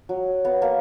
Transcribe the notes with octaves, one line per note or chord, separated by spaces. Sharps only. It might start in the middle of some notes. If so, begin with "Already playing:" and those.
F#3
B3
A#3